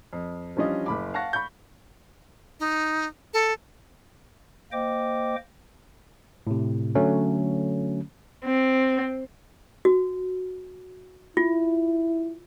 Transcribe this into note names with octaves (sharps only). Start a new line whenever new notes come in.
F2
E3 F3 G3 C#4 D4 D#5
F#1 B5 D6
F5 F#5 A5 C#6 F#6 A#6
B5 C#6 G6
D#4
A4
A#3 C5 D#5 G5 D6
A2 C3
D3 F#3 A3 C#4
C4
F#4
E4 F4